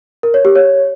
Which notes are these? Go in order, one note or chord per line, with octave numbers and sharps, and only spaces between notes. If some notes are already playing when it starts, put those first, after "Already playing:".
A#4
C#5
G4
C#5